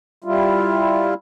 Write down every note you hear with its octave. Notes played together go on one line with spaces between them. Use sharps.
G3 E4 F4